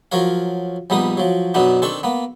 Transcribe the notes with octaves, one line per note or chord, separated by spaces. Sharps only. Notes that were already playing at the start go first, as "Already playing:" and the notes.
F3 F#3 A#4 C#5 F5
A#1 G3 B3 D#4 D#6
F3 F#3
F#2 B2 B3 D4 D#4
D#3 C4 D4 A4 C#6
A#3 B3